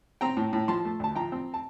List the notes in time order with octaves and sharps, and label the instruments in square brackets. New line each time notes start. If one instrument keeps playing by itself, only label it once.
[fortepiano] C4 G5 A#5
A2
A2
F3 A5 C6
A3
D2 A5
F3 G5 A#5
C4
A5